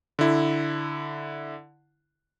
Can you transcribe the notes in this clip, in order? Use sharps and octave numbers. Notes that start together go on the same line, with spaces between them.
D3 E4